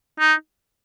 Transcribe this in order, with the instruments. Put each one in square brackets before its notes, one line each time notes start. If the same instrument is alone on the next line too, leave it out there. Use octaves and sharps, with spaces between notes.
[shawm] D#4